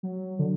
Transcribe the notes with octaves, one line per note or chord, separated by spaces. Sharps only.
F#3
D3